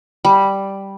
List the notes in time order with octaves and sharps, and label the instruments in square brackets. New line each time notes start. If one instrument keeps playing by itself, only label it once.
[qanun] G3